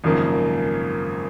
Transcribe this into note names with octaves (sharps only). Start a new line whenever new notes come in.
G#1 F#2 C#3 F3 A#3